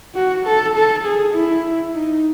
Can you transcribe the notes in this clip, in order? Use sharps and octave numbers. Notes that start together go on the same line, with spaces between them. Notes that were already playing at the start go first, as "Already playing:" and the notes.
F#4
A4
A4
G#4
E4
D#4